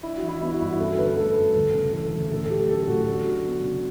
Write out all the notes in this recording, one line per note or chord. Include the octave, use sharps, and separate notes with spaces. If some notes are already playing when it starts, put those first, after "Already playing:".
D4 E4
F#4
E3
E4
B3 E4
F#4
G2 E4
F#4
C#4 A4
D3 B4
A3 A4
G2
D2
C#3
E3 A4
D2
A2 A4
A4
F#3 G4
C#4 A4
A2 F#4
D4
F#3
B3
C#3